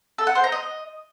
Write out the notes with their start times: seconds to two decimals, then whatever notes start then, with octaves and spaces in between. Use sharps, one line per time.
0.18 A4
0.27 F#5
0.35 C5
0.44 A#5
0.52 D#5